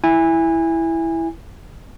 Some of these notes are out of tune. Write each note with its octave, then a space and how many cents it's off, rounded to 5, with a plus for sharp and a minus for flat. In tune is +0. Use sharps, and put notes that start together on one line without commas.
E4 +0 G#5 -25